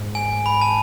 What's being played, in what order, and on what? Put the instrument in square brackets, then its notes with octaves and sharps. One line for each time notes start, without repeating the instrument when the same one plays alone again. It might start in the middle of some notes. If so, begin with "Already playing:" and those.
Already playing: [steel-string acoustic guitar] G#2
[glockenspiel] G#5
B5
A5